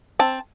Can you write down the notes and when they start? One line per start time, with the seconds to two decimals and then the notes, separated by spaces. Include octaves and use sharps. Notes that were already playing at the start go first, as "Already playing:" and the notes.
0.19 C4 A5